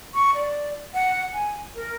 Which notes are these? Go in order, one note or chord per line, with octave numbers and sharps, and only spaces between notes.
C#6
D5
F#5
G#5
A#4